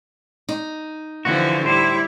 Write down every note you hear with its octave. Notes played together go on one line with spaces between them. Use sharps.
D#4
D3 E3 F3 F#4
A2 G3 E4 C5